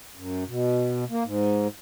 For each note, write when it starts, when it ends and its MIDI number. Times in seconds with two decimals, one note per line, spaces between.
0.16 0.44 42
0.48 1.04 47
1.10 1.23 58
1.24 1.68 44